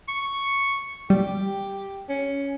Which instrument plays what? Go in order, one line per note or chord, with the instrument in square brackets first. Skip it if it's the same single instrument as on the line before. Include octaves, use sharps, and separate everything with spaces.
[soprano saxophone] C#6
[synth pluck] G3 [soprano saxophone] G4
[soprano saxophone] C#4